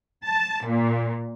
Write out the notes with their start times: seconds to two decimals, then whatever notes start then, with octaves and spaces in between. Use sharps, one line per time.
0.24 A5
0.65 A#2